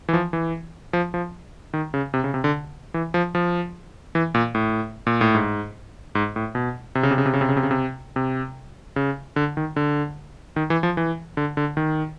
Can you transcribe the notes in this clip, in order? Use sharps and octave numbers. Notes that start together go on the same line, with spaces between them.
E3
F3
E3
F3
F3
D#3
C#3
C3
C#3
C3
D3
E3
F3
F3
E3
A#2
A2
A#2
A2
G#2
G#2
A2
B2
C3
C#3
C3
C#3
C3
C#3
C3
C#3
C3
C#3
C3
C3
C#3
D3
D#3
D3
D#3
E3
F3
E3
D3
D3
D#3